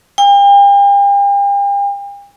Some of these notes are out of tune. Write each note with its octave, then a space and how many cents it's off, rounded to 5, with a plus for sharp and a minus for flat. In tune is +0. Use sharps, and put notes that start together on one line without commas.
G5 +40